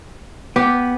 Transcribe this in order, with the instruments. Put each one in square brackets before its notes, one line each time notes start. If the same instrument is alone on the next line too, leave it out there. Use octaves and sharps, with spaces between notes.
[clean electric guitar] B3 [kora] G4